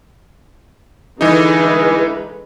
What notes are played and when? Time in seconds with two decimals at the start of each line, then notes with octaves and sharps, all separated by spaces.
1.21 D3 E3 G#3 D#4 B4